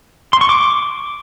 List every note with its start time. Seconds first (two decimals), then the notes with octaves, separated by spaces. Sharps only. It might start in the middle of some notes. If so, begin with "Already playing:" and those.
0.33 C6
0.41 C#6
0.49 D6